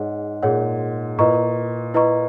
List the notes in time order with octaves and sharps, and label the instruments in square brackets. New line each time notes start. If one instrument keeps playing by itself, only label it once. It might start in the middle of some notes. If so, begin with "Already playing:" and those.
Already playing: [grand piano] G#2 [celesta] G#4 C#5 F#5
[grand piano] A#2 [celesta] G#4 C#5 F#5
[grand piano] A#2 [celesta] E4 B4 D#5 A#5 C#6
[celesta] E4 B4 D#5 A#5 C#6